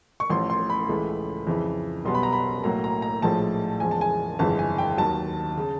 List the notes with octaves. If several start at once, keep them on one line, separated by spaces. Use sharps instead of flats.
C#6
A1 A2 F3 C6
C6
B5
C#2 C#3 E3 A3
F2 C#3 E3
B1 B2 G3 B3 C6
B5
A#5
B5
B1 A2 F#3 A#3 A#5
A#5
A#5
A#1 A2 F3 G#3 A5
E2 C#3 F3 G#3 G#5
A5
G#5
G1 F2 C#3 E3 G#3 A5
G#5
G5
D#2 D#3 F#3 A5
C#3